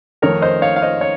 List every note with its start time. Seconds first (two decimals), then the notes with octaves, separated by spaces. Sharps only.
0.22 F2 D#3 A3 A#4 C#5
0.42 C5 D#5
0.62 C#5 F5
0.76 F5
0.82 C5 D#5
1.01 C#5